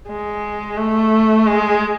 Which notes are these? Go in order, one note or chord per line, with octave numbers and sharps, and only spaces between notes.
G#3
A3
G#3